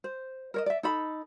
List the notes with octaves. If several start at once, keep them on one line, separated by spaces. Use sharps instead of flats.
C5
A#4 C#5 D#5
D5 E5
D#4 A4 B5